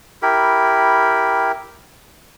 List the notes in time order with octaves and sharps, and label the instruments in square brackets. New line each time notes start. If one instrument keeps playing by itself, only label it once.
[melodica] E4 G4 A#4 B5